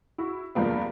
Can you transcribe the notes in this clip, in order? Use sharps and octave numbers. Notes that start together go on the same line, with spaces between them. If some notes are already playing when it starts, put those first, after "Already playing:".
E4 F#4
E2 G2 C3 F3 A#3 B3